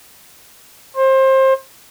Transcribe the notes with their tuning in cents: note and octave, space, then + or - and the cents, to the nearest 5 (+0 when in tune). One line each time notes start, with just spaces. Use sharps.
C5 +25